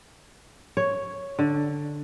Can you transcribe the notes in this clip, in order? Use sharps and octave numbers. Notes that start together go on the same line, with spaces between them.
C#5
D3